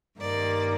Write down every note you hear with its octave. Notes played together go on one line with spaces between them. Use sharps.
G2 D#3 A#3 D5